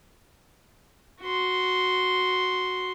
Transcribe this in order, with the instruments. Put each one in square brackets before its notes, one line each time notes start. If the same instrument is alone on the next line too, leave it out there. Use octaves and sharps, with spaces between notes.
[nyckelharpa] F#4 C6